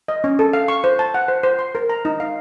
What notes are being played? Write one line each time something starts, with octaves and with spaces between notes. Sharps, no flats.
D#5
C#4
A4
F5
C#6
C5
A5
F#5
C5
C5
C6
A#4
A#5
D#4
F5